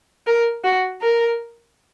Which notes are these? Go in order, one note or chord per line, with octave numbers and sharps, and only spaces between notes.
A#4
F#4
A#4